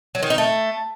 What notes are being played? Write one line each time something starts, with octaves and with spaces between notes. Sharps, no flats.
F#3
D#3
D#4
A3